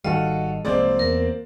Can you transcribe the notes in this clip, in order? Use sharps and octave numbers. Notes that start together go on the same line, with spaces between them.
G#1 D#3 G3 F#4 A4 D#5 F5
C2 F3 G#3 A#3 C4 D5
E2 A#4